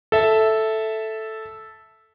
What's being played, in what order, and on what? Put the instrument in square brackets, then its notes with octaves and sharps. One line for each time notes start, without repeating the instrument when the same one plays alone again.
[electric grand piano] A4 E5